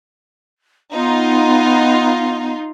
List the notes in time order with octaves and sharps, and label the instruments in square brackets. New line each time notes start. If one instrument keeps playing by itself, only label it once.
[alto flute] B3 [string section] D#4 F4